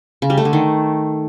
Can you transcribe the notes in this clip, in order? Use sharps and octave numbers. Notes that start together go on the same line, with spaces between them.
C#3
G3
A3
D3
D#3